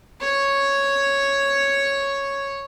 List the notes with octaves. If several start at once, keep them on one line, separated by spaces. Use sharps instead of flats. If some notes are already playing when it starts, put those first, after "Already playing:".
C#5 C#6